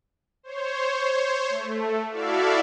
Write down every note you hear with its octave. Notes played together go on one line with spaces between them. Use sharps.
C5 C#5
A3
E4 F#4 A4 D5 E5 F5